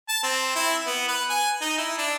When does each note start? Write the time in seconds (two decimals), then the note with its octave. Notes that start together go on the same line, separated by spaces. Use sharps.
0.09 A5
0.23 C4
0.56 E4
0.87 B3
1.08 B4
1.30 G#5
1.61 D#4
1.78 E4
1.98 D4